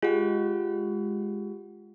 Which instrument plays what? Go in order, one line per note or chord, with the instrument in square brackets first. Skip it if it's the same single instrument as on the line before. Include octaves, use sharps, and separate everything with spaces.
[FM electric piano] G#3 [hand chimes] F4 G4 F#5